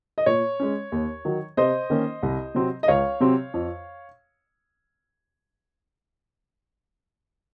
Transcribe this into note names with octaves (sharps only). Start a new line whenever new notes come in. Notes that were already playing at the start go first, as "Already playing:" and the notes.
D#5
A#2 C#5
G#3 C#4
D#2
D#3 F#3
C3 C5 D#5
D#3 A#3 C#4
C2
C3 F#3 C4
D#5
C#2 C#5 F5
C3 F#3 C4
F2